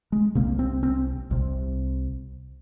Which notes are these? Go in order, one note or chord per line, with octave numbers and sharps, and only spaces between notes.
G#3
C2 C3 A#3
C4
C4
C2 C3